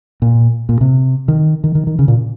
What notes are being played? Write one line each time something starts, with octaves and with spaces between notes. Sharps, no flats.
A#2
A#2
C3
D#3
D#3
D#3
D#3
C#3
A#2